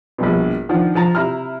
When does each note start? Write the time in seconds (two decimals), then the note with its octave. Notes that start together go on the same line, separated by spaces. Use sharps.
0.18 A#1 G2 B2
0.69 D#3 F3 D4 F#5
0.95 F3 A5 A#5
1.15 C3 E4 A#5 F6